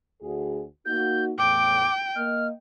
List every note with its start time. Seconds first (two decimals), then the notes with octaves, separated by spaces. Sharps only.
0.21 D2 F#4 G#4
0.86 A#3 D#4 F#4 G6
1.39 E2 A2 G5 D6
2.16 A#3 D#5 F6